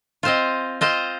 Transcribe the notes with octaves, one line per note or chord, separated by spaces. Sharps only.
C4 F4 C5 D#5
C4 F4 C5 D#5